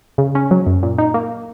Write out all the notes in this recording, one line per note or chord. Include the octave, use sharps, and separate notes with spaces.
C#3
C#4
F#3
F#2
A#2
D#4
A#3